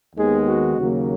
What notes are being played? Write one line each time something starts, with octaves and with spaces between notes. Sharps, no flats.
D#2 D#3 G#3 B3 G#4
F#4
D#2 C#3 F#3 A#3